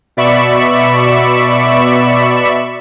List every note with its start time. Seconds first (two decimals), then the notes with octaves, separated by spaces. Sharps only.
0.17 B2 D5 E5 B5 C#6 E7